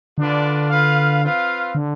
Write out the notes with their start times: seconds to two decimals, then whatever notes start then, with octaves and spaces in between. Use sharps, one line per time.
0.18 D3 D4 F4 B4 D5
0.70 F4 B4 F5
1.23 C4 F4 B4 F5
1.75 D3